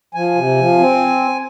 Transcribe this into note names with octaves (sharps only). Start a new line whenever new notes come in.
F3 G#5
C3
F3
C4